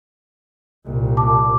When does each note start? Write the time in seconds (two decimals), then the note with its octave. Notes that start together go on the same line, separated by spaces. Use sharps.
0.85 C2 A#2
1.17 A5 D6